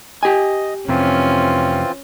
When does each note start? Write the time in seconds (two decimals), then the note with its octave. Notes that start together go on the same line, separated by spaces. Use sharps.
0.23 G4 D#5 G#5
0.89 F2 C3 E3 C4 C#4 F4